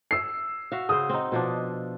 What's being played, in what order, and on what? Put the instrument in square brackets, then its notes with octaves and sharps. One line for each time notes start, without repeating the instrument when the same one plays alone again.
[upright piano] E6 C7
[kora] F#4 E5 F5
[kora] C#3 C5 [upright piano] D#6
[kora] C4 D#4
B2 F3 D4